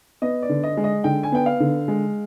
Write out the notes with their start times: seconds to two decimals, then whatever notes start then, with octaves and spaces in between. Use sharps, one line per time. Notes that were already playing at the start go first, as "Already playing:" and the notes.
0.22 B3 D#5
0.42 D5
0.49 D3
0.64 D#5
0.77 G#3
0.84 D#5
1.04 D3 G5
1.23 G#5
1.32 B3 G5
1.46 F5
1.60 D3
1.88 G#3